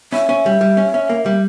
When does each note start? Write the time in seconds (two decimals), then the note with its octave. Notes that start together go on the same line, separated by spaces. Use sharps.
0.13 C#4 E5
0.29 C#4
0.46 G3
0.61 G3
0.77 C#4
0.94 C#4
1.10 A#3
1.26 G3